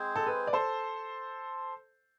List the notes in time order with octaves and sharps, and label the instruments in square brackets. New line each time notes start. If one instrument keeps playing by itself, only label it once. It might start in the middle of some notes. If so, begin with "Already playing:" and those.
Already playing: [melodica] G#3 C4 G#4 C5
[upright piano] A4
B4
D5
A4 C5